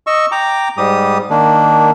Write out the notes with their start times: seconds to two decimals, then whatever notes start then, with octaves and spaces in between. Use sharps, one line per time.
0.07 D#5 C#6 E6
0.32 G5 A#5 D6
0.77 G#2 G3 G4 D#6
1.30 D#3 A#3 D4